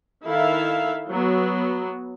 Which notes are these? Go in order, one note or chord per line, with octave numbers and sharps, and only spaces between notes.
D#3 E4 A4 E5 F5
F#3 B3